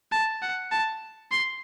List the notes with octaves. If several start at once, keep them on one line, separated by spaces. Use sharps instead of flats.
A5
F#5
A5
C6